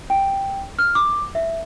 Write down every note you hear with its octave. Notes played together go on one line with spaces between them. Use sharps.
G5
F6
D6
E5